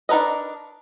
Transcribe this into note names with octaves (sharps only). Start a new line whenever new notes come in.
D4 D#4 A#4 B4 D#5